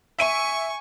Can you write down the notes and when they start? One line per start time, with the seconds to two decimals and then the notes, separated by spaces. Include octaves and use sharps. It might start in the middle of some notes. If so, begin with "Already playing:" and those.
0.19 E5 G#5 C#6 D7 D#7